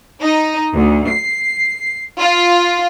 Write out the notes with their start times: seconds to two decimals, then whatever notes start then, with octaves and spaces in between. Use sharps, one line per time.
0.22 D#4
0.74 D2
1.10 C7
2.20 F4